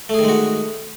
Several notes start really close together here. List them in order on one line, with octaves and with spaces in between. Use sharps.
A3 G#4 D#3 G#3 F#4